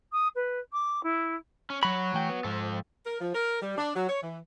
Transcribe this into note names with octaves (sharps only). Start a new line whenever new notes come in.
D#6
B4
D6
E4
C#4
F#3 F#4 C#5 B5
E3 A3 G5
B3
G#2 F3 A4
A#4
F3
A#4
G3
D4
F#3
C#5
E3